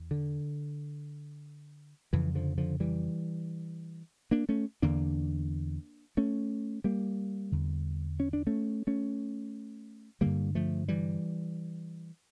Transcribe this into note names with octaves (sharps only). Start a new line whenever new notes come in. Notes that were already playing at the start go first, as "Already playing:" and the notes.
Already playing: E2
D3
F2 C#3 E3
D3 F3
D3 F3
E3 G3
A#3 D4
A3 C#4
E2 D3 A#3 D4
A3 C#4
G3 A#3
E2 D3
C#4
D4
A3 C#4
A3 C#4
G2 D3 G3 A#3
F3 A3
E3 G3